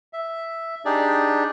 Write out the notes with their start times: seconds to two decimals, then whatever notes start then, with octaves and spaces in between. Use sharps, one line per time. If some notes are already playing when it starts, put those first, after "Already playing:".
0.13 E5
0.85 D4 D#4 G4 G#4 D5